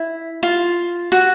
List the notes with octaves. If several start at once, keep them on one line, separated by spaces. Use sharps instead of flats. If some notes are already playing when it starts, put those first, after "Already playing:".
Already playing: E4
F4
F#4